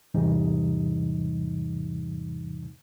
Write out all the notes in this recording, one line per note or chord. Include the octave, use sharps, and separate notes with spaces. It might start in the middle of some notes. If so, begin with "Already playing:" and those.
E2 G#2 C3 E3 G3 D#4